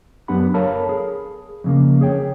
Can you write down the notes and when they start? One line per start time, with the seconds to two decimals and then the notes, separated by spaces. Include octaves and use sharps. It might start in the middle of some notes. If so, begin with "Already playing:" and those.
0.28 F#2 B3 D4 G4 F#5 B5
0.54 A4 A#4 C#5 F5 A5 B5
0.89 G#4
1.64 F2 C#3 A#3
2.01 G#4 C#5 G5